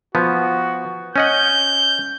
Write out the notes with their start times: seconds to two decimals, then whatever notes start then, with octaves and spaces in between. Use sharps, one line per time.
0.15 F3 B3 F#4
1.16 C#4 D#5 F#5 G6